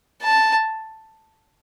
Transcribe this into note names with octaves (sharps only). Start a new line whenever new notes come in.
A5